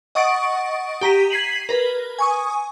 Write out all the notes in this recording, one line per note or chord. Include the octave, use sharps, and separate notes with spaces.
D#5 F#5 C#6 D#6 A6 D7
G4 A#5 B6 D#7
G#6 B6 C7 D#7 F#7
A#4 B4
G#5 C#6 D#6